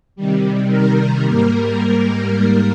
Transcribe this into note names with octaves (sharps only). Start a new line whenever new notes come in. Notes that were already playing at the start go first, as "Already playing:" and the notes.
C3 D#3 G3
A#4
G#2 G3 A#3